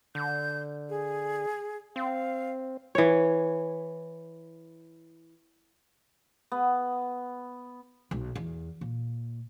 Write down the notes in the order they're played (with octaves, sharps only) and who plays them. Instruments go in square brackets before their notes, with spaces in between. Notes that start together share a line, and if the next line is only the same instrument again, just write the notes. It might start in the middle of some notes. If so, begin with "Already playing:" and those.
[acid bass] D3 [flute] G6
[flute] G#4
[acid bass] C4 [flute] F5
[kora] E3 C#5
[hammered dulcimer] B3
[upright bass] B1
E2
A#2